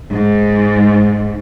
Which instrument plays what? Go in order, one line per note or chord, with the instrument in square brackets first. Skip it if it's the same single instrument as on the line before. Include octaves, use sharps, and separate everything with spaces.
[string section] G#2